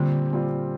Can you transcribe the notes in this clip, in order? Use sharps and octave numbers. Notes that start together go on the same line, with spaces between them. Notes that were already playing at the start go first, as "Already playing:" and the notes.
Already playing: A#2 D3 G3 C4 F4
A#2 G3 C4 F4